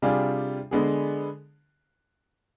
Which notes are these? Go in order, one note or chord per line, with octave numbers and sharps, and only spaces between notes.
C3 G3 D4 F4 G#4
D3 G#3 B3 D4 G#4